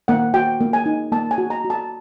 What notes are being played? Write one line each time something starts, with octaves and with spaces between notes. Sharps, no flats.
A#3 F#5
F#4 G5
A#3
G#5
D#4
A#3 A5
G#5
F#4
A#5
F#4
A5